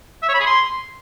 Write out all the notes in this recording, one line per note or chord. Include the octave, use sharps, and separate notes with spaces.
E5
C#5
B5
G#4
C6